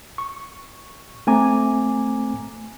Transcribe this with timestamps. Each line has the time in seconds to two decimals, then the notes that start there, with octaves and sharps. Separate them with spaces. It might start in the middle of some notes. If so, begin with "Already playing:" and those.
0.18 C#6
1.27 A3 C4 G#5 A#5 D6